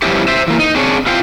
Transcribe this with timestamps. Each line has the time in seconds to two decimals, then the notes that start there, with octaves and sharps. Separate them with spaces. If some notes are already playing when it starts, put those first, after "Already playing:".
0.02 F3 G3 B3 C#4 E4 G4
0.28 C5 E5
0.48 E3 A#3
0.59 D#4
0.75 C4 D4 G#4 C#5
1.06 E4 F4 C5 F5 G5